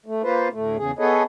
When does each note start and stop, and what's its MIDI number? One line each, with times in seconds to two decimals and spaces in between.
0.06 0.22 57
0.23 0.48 58
0.23 0.48 65
0.23 0.48 71
0.23 0.48 72
0.53 0.77 38
0.53 0.77 45
0.53 0.77 57
0.77 0.91 40
0.77 0.91 49
0.77 0.91 68
0.99 1.23 59
0.99 1.23 68
0.99 1.23 69
0.99 1.23 71
0.99 1.23 73
0.99 1.23 75